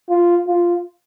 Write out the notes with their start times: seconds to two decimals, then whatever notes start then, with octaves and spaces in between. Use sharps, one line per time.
0.09 F4
0.48 F4